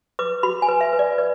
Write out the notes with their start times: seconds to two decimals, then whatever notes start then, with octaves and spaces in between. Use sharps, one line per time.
0.19 B4 D6
0.43 F#4 B5
0.62 G#5
0.68 B4
0.81 E5
0.93 B4
0.99 D5
1.18 B4 D5